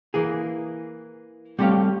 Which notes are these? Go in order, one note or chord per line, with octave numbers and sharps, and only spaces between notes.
E3 A#3 G#4
G3 A3 C4 G4 C#5 F5